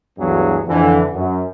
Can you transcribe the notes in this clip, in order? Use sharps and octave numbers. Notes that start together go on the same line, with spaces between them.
D2 G2 E3 F#3 B3 G#4
F2 D3 E3
F#2